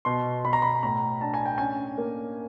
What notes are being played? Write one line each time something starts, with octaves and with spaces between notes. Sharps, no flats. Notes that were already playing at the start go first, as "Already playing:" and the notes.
B2 C6
B2 B5
A#5
B5
A2 A#5
D4 A5
G#5
G5
C#4 G#5
A#3